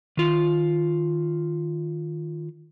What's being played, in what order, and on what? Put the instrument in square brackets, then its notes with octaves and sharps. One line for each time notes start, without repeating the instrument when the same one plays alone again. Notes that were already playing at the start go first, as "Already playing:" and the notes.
[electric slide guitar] D#3 F4